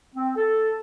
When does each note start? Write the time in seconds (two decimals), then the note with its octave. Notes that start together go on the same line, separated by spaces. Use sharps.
0.15 C4
0.37 A4